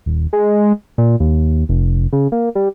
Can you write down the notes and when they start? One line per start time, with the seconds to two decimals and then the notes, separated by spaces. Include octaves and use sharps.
0.06 D#1
0.33 G#3
0.98 A#2
1.20 D#2
1.69 F1
2.13 C#3
2.32 A#3
2.55 G3